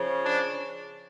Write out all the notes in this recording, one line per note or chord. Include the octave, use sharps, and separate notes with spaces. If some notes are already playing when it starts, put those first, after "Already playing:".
Already playing: C#3 F3 C#4
D4